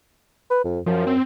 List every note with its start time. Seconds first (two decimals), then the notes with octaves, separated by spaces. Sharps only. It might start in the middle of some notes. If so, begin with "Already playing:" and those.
0.50 B4
0.64 F2
0.86 F#2 F3
1.07 C4